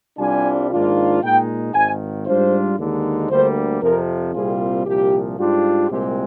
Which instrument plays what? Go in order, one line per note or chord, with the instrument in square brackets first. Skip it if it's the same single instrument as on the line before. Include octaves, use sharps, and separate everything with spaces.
[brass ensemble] C2 C3 G3 D4 F4 G#5
G#2 D#3 A#3 D4 F4
A#2 G#3 D#4 G5
G#1 G#2 D#3 G#5
G#2 G3 D4 F4 C5
D#2 D3 G#3 D#4
D2 D3 G3 A#3 C5
F2 C3 F3 A#4
C2 A#2 G3 C4 F4 G#4
C2 A#2 F3 G4
G#2 G3 D4 F4
C2 A#2 G#3 C4 G4